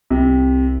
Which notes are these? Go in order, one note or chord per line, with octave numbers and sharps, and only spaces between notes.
C2 C3